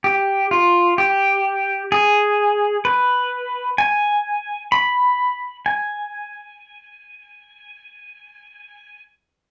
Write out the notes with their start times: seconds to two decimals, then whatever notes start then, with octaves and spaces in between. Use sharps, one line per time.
0.04 G4
0.51 F4
0.98 G4
1.92 G#4
2.85 B4
3.78 G#5
4.72 B5
5.66 G#5